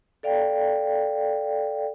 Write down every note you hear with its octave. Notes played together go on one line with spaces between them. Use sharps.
A4 D5 F5 G5